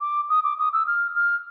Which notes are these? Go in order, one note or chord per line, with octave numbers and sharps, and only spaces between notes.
D6
D#6
D6
D#6
E6
F6
F6